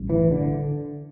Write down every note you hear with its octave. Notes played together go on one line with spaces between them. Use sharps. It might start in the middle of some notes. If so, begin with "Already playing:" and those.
Already playing: A1 G2
E3
D3